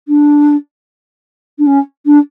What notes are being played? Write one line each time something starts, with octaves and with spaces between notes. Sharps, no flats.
D4
D4
C#4
D4